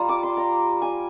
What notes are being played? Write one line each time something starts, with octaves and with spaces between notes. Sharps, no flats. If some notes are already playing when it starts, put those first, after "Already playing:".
Already playing: G3 F4 A#5
D6
C6
A#5
G#5